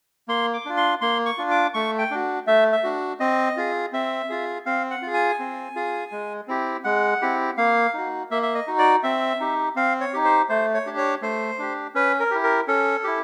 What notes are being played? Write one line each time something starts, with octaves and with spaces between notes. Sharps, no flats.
A#3 C6
D6
D4 F4
C6
A#3 C6
C#6
D4 F4
D6
A3 C#6
G5
D4 F#4
A3 E5
E5
D4 F#4
C4 D#5
F4 G#4
C4 E5
F4 G#4
C4 F5
F#5
F4 G#4
G#5
C4
F4 G#4
G#3
C4 E4 G4
G#3 F#5
C4 E4 G4
A#3 F5
D#4 F#4
A#3 E5
E5
D#5
D#4 F#4
D5
C4 E5
D#4 G4
C4 F5
C#5
D#4 G4
C5
A3 C5
C#5
D4 G4
C#5
A3 C5
D4 G4
C#4 B4
A#4
E4 G4
A#4
C#4 A4
E4 G4